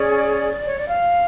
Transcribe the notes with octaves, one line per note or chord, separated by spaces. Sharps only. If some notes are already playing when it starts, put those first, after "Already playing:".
Already playing: C#4 G#4 C#5 D5
C#5
D5
F5